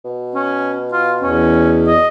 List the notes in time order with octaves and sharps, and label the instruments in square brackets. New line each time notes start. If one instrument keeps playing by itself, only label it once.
[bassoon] B2
[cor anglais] C#4
F4
[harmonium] E2 [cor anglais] C#4
[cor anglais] D#5